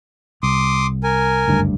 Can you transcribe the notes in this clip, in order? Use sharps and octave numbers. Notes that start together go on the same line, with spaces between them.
C2 C6 D6 D#6
A#4 G#5
F#1 D2 G2